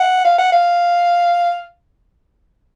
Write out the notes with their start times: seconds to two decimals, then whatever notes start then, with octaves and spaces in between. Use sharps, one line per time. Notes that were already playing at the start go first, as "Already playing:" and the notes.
Already playing: F#5
0.25 F5
0.38 F#5
0.52 F5